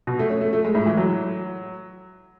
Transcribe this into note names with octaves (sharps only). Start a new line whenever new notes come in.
B2
A3
C#4
A3
A3
G#3
A2
E3
F#3